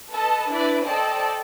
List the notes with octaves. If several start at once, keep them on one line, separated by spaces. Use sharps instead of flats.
A4 B4 D#5 A5
D4 E4 B4 D5
A4 C5 D5 D#5 G5 A5